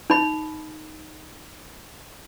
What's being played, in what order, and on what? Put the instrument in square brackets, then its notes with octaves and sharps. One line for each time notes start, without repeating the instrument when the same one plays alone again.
[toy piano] D#4 B5